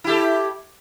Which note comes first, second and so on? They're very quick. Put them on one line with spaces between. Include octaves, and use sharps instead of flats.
E4 G4 A4